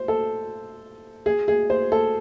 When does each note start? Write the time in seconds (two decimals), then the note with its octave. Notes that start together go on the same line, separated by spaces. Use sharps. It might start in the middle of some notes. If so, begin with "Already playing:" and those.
Already playing: C5
0.08 A4
1.26 G#4
1.48 G#4
1.70 C5
1.92 A4